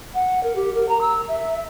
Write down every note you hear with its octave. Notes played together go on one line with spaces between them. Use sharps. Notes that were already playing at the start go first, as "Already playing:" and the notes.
F#5
A#4
G4
A#4
A#5
E6
E5